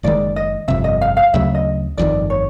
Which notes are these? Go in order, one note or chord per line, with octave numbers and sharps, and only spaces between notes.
F#1 F#2 D#3 G#3 D5
D#5
G1 F2 C3 E5
D#5
F5
F5
D2 C#3 F#3 E5
D#5
G1 F2 C3 D#3 D5
C#5